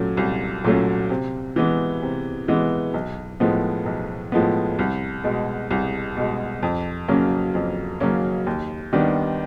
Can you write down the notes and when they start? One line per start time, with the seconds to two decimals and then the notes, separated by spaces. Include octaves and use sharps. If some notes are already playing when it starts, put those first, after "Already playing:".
Already playing: A#2 F#3 A3 C#4
0.17 C2
0.64 A#2 F#3 A3 C#4
1.10 C3
1.56 E3 G#3 B3
2.02 C3
2.48 E3 G#3 B3
2.94 B1
3.40 A2 F3 G#3 B3
3.86 B1
4.32 A2 F3 G#3 B3
4.79 C2
5.24 B2 G#3
5.71 C2
6.17 B2 G#3
6.63 F2
7.08 C#3 F#3 A#3 C#4
7.55 F2
8.00 C#3 F#3 A#3 C#4
8.46 D#2
8.93 D#3 G3 B3 D4